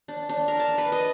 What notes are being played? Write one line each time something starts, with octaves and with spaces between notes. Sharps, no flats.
D4
D4
A#4
A5
B4
D#5